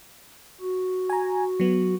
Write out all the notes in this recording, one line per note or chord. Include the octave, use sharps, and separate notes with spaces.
F#4
G#5 A#5
F#3 B3